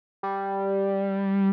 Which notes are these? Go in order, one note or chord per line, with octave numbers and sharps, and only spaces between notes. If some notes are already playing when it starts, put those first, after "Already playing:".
G3